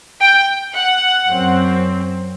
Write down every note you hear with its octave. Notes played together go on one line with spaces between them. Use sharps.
G5
F#5
F#2 F#3 C4